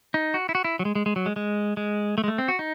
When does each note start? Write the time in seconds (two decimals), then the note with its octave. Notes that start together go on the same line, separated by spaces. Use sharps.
0.14 D#4
0.34 F#4
0.49 E4
0.55 F#4
0.64 E4
0.79 F#3
0.85 G#3
0.95 G#3
1.06 G#3
1.16 F#3
1.26 G#3
1.36 G#3
1.77 G#3
2.18 A3
2.24 G#3
2.28 A3
2.38 C4
2.48 F#4
2.59 D#4